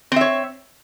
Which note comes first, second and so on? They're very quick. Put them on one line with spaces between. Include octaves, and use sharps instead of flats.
C4 E5 C#5